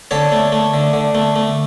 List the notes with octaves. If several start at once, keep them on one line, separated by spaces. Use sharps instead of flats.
D3 A4 C#5
A3
A3
D3
D3
A3
A3